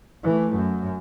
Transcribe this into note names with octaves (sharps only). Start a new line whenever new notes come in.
E3 A3
F#2